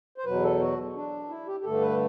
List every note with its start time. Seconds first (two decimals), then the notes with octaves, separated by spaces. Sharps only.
0.18 C5
0.25 E2 B2 F#3 B4
0.43 A4
0.60 F#4
0.95 D4
1.29 E4
1.47 G4
1.60 G4
1.64 G2 D3 A3 A4
1.82 B4